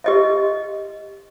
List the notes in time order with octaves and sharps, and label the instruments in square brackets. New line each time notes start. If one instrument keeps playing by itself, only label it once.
[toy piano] G4 D#5 E5